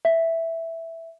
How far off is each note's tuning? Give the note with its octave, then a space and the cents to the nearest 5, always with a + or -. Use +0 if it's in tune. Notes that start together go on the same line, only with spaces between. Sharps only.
E5 +0